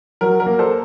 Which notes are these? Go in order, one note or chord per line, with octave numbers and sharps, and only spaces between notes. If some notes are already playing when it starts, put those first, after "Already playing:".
F#3 A#4
A#4
A#3
A4 C5